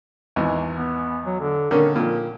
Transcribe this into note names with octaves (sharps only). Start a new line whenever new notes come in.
G#1 E2
B3
F#3
D3
D3 D#3 A#3 C#4
A#2 F3